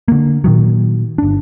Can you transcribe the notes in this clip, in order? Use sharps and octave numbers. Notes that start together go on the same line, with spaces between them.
D3 A#3
A#2 D#3 F#3
G1 D4